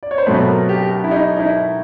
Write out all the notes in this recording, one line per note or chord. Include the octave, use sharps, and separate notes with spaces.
D5
C#5
C5
B2 F#3 A3 C4 B4
A#4
G4
G4
E4
D#4
D#4
E4